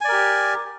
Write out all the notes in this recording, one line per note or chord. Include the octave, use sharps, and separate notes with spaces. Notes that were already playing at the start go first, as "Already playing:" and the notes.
G4 A#4 D5 G#5